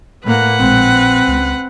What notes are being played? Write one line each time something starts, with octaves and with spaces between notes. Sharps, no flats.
A2 A#3 B4 F#5
A#1 G#3 C4
C#2